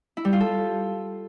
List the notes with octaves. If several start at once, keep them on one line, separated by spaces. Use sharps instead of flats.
E4
G3
F4
A4